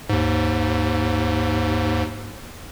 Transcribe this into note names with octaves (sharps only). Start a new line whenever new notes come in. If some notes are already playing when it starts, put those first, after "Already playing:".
D#2 G#2